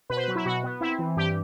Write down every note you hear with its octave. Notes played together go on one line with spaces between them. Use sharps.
B2 B4
C5
B4
F#3
E4
B2 F#4
B3
C4 E4
E3
G2 G4